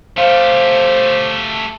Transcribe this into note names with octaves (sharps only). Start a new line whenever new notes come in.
A3 G4 C5 F5